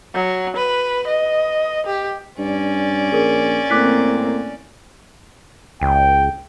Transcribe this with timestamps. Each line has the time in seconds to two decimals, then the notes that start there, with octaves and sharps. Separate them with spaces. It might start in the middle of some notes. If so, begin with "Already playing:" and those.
0.15 F#3
0.56 B4
1.07 D#5
1.87 G4
2.38 G2 C#4 D5
3.12 A#1 G#4 A#4 C#5
3.70 A2 A#3 C4 D6 F#6 B6
5.81 C#2 G5